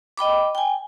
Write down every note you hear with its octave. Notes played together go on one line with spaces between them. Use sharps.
D#5 G5 B5 D6
G5 G#5